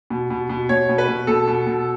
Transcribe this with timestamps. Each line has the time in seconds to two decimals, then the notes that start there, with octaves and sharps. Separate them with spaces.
0.10 B2
0.30 B2
0.49 B2
0.69 B2 C#5
0.89 B2
0.98 B4
1.08 B2
1.27 B2 A4
1.48 B2
1.67 B2